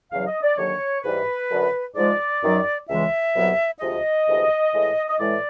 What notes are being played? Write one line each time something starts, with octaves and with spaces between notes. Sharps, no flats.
E2 C#3 F#3 F5
D#5
D5
D#2 D3 F#3 C#5
G#2 E3 G3 B4
F#2 D3 F#3
G#2 F3 G#3 D5
F#2 D#3 F#3
C#2 C#3 E3 G#3 E5
C2 B2 F#3
D2 C3 F3 G#3 D#5
D2 C3 E3 G#3
A2 E3 G#3
D#5
A2 E3 G#3 D5